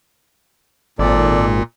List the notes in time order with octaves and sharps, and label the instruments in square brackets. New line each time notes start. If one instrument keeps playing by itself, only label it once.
[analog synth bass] G#1 [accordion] A#2 [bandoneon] A4 D5